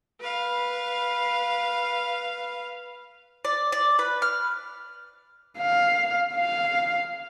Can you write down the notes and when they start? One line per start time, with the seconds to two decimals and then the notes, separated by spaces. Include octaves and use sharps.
0.20 B4 F5
3.45 D5
3.72 D5
3.99 B4
4.22 F6
5.59 F5
6.34 F5